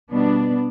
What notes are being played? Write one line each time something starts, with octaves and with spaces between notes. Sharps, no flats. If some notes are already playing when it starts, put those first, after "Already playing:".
B2 G3 B3 D4